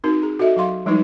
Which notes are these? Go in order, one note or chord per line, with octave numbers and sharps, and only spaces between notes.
C4 D#4 F#4 A#4
G#4 A#5
F#4 A4 D#5 E5
F#3 F5 C6
F3 G3 G#3 D#4 E4 B4